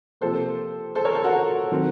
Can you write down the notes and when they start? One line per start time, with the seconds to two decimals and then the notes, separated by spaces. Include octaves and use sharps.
0.21 C3 F3 A#3 A4 C5
0.95 A4 C5
1.05 A#4 C#5
1.14 A4 C5
1.24 F#4 A#4
1.72 D#3 F#3 C4